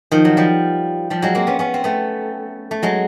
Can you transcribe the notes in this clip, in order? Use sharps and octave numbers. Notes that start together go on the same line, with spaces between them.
D#3 F3
F#3
F3 G3
F3 G3
F#3 G#3
A#3 C4
B3 C#4
B3 C#4
C4
A3 B3
A3
F#3 G#3